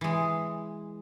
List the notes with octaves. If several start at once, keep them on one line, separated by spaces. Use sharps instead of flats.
E3 G#3